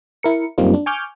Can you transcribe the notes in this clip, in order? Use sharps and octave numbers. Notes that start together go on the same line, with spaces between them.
E4 A#4 C#7
F#2 G3 A#3 C4 D#4 F4
D4
G#5 C#6 D6 F6 G6